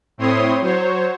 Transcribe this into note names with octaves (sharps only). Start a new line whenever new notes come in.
A2 C4 E4 C#5 C6 D#6
F#3 C5 C#5